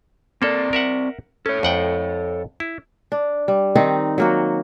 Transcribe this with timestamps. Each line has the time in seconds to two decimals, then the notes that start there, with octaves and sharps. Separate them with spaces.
0.42 A#3 C4 A4 D5
0.73 A#4 E5 F#5
1.46 C#4 A4 C#5
1.63 F2 F#5 G5
2.60 E4
3.12 D4
3.48 G3
3.76 D#3 C4 D#4
4.18 F#3 A#3 F#4